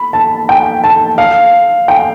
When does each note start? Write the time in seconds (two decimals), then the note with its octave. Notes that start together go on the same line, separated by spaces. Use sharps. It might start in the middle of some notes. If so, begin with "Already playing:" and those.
Already playing: B5
0.13 A5
0.49 G5
0.84 A5
1.18 F5
1.88 G5